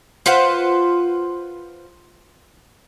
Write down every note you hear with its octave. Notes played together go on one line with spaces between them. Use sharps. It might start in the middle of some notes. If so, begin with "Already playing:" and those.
F4 B4 C5 F#5